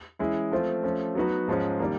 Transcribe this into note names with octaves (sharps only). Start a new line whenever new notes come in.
E3 G#3 C#4 E4 G#4
F3 A3 C4 F4
F3 A3 C#4
F#3 B3 D#4 F#4 B4
G#2 F3 G#3 C#4
D#3 G3 A#3